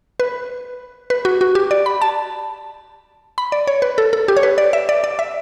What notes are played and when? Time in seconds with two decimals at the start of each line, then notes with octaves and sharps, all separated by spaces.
0.20 B4
1.10 B4
1.25 F#4
1.41 F#4
1.55 G4
1.71 D5
1.86 B5
2.02 A5
3.38 B5
3.52 D5
3.67 C#5
3.82 B4
3.98 A4
4.13 A4
4.28 G4
4.37 C#5
4.43 B4
4.58 D5
4.73 E5
4.89 D5
5.04 D5
5.19 E5